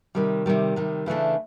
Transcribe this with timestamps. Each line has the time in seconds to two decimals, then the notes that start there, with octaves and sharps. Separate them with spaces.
0.15 C3 D#3 G3
0.46 C3 D#3 G3
0.76 C3 D#3 G3
1.06 C#3 E3 A3 D4